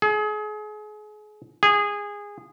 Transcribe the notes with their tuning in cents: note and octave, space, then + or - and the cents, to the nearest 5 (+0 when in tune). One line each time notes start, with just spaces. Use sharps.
G#4 +35
G#4 -15